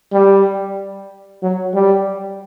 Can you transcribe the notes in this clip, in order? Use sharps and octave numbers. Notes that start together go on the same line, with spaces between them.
G3
F#3
G3